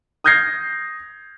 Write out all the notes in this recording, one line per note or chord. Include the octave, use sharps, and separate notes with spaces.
D#6 F6 G6 G#6 A#6 C7